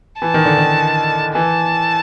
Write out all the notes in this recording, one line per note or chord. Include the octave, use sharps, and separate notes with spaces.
E3 A5
D#3
D3
D#3
E3 A5